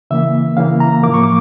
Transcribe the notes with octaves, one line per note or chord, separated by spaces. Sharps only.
C#3 E3 A#3 E5
C#3 E3 A#3 F5
A#5
A2 F3 A#3 D6
C#6
D6